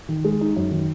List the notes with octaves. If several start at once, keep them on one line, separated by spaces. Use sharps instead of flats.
D#3
G#3
D#4
F#2
D#3